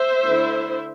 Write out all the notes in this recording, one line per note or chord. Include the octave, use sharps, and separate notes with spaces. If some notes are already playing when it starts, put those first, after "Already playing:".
Already playing: C5 E5
D3 A3 E4